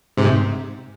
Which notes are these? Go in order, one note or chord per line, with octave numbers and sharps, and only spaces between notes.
G#2 C3